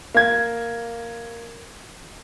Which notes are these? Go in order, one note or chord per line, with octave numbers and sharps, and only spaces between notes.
A#3 G#6